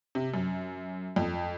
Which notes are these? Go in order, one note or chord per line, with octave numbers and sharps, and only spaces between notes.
C3
F#2
F2